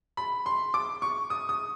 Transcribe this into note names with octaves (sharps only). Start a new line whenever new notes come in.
B5
C6
D6
C#6
D#6
D#6